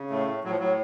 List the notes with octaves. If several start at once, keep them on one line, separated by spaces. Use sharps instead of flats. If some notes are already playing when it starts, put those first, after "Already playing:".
Already playing: C#3
A2 A3
A2
A2 F#3
F3
A2 F#3